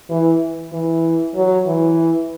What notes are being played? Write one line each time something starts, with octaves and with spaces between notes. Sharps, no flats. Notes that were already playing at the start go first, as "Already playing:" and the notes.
E3
E3
F#3
E3